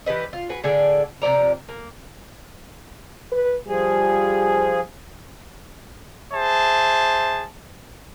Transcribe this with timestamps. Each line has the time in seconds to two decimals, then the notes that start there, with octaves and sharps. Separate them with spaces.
0.06 E3 G4 B4 D#5
0.33 F4
0.49 F#4 G#4 B4
0.64 A2 D3 G#4 D5
1.22 C3 F3 D5 A#5
1.69 A#3
3.32 B4
3.68 F3 G3 G#4
6.34 G#4 C5 E5 A5